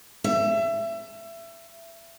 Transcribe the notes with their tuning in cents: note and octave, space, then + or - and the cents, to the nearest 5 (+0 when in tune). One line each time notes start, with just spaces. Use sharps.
E5 +25 A5 +0